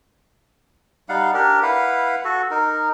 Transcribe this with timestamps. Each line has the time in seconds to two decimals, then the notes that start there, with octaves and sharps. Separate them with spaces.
1.09 G3 D#4 F5 F#5
1.34 D4 G4 A#4
1.62 E4 B4 F5 F#5
2.25 F#4 A4
2.51 D#4 A#4